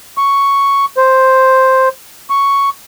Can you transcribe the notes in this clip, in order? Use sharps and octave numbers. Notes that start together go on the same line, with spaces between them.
C#6
C5
C#6